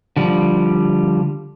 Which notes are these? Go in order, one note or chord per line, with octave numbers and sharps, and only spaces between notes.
D3 F3 G3